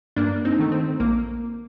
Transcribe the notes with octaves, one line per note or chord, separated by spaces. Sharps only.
G2 A#3 D4
C4 D#4
D#3 A3
C4
A#1 A#3